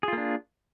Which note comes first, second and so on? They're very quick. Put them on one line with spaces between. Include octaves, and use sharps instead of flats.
G#4 F4 A#3 D4